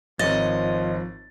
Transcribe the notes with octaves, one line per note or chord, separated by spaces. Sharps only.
G#1 F3 C#5 D#5 A6